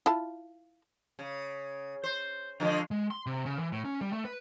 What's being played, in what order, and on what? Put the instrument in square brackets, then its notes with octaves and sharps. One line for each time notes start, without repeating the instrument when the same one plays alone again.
[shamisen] E4 F4 A5
[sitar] C#3
C5
D3 F3 G#3
[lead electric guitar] G#3
C6
C3
C#3
E3
A2
C#4
G3
A3
B4